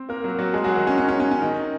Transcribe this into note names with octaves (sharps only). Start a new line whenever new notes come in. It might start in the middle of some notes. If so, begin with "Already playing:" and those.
Already playing: C4 C5
A#3 A#4
F#3 F#4
F#3 F#4
G#3 G#4
F#3 F#4
D#3 D#4
C#4
C#4
C#4
C#4
C#4
D#3 D#4